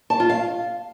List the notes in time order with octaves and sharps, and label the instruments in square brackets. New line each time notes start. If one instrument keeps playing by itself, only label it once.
[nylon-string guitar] A5
F4
F5